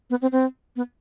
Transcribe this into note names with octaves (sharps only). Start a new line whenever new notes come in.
B3
C4
C4
B3